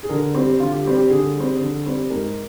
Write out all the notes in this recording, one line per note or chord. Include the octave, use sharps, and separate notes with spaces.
G#4
D3 A#4
G3 C4 G4
D3 F4
G4
G3 C4 G4
G4
D3 G#4
G3 C4
D3
G3 C4
G#2 A#4